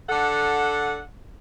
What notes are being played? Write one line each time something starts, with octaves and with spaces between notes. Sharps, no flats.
D3 A4 F#5